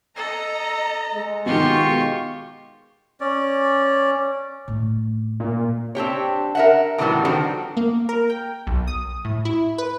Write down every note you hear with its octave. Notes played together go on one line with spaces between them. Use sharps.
A4 D#5 A#5
G#3
B2 D#3 F4 G4 C#6
C#4 D5
A2 A3
A#2
C4 D4 G4 C#5
A#4 E5 F#5
A2 D#3 E3 F#3 G3 B3
D#3 F3 G3 D4 F#4 A4
A#3
A#4
G5
B1
D#6
A2
E4
B4